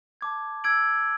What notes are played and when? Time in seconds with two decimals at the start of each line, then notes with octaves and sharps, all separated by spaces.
0.21 A5 D6 G#6
0.64 E6 G#6 D7 F#7